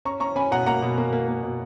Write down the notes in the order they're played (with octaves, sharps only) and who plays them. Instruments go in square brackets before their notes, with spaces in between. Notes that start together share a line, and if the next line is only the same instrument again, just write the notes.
[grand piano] C#4 A#5 C#6
C#4 A#5 C#6
C#4 G#5 B5
B2 F#5 A#5
A#3 F#5 A#5
B2
A#3
A#3
A#3
B2